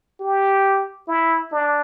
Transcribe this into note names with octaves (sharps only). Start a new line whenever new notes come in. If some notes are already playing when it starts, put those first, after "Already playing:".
G4
E4
D4